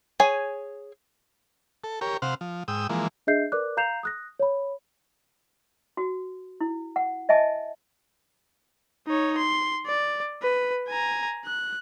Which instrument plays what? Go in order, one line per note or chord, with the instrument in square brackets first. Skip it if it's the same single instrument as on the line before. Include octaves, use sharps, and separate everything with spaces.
[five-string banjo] G#4 C#5 G#5
[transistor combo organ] A4
G4 A#4 C#5
C3 C5 F5 F#5
F3
G#2 G5 D#6 E6
E3 F3 G#3 A#3
[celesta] D4 G#4 D#5 E5 G6 C7
A#4 B4 D5 D6 F#6
F5 A#5 G6 C7 E7 F7
D#6 F#6 A#6
C#5 B5
[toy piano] F#4
E4
F#5
D#5 E5 G#5 A5
[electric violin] D#4 C#5
C6
D5
B4
G#5 A#5
F#6